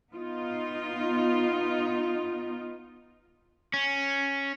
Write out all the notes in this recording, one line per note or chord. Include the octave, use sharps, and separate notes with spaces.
B3 D#4 F4
C#4